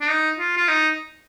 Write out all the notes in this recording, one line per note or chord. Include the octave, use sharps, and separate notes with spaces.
D4
D#4
F4
F4
D#4